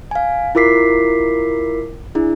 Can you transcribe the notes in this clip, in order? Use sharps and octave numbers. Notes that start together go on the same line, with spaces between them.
F5 G#5
E4 F4 A#4 D6 B6 C7
D4 E4 G#4